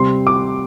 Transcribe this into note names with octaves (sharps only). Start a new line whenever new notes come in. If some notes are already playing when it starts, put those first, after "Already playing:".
Already playing: C3 G3 C4 C6
D6